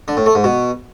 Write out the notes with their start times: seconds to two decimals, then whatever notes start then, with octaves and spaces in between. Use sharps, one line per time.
0.08 D3
0.17 A2
0.26 A3
0.35 G#2
0.44 B2